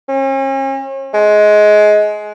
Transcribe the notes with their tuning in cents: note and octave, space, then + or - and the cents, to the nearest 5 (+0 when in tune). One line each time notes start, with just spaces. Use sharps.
C#4 -40
G#3 +20